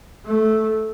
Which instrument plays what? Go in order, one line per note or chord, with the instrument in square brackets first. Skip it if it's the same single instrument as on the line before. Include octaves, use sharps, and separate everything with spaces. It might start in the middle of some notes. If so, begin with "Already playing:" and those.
[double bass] A3